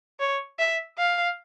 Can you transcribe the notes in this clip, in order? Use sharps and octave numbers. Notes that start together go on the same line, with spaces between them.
C#5
E5
F5